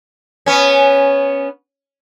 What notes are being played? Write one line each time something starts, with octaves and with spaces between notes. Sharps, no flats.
B3 C#4